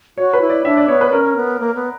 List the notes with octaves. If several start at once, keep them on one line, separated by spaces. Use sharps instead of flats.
F#4 C#5
B4
E4
D5
D4 E5
D5
B3 C#5
B4
C#4 A#4
B3
A#3
B3